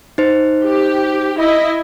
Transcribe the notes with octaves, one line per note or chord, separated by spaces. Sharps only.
D#4 C5
G4
E4 D#5